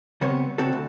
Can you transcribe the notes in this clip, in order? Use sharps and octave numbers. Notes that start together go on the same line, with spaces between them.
C#3 G3 B3 C4 C#5
C#3 C4 F#4 A4
D2